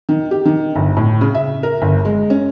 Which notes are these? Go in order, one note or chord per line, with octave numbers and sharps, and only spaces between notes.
D#3
G4
D#3
G1
A2
C#3
E5
A#4
G1
G#3
C#4